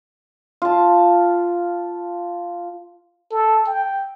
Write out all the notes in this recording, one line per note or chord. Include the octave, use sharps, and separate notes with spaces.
F4 A5
A4
G5